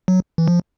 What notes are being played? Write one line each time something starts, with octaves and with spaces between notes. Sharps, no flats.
F#3
E3
F3